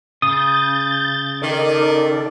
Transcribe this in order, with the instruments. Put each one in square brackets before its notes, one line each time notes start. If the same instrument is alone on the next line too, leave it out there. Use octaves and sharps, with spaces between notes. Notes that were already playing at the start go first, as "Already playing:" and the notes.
[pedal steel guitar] C#3 [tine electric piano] D#6 [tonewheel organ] G6 A6
[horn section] D#3 [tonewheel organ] D#4 A4 D5